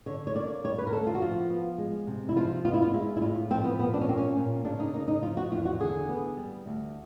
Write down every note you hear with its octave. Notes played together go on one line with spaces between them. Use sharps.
D3 C#5
C#5
A#3 D5
G3 C#5
B4
A#4
D2 A4
F4
F#4
F3 F4
B3
G#3
C3
E4
F3 F4
B3 F4
E4
F4
G#3 E4
E4
A2 F4
F3 C4
B3
A#2 B3
D4
C#4
A#3 C4
C#4
A#2
C#3 D4
D#4
A#3 D#4
D#4
F3 F4
F#4
E2 F4
F#4
D3 G#4
B3
G3
D2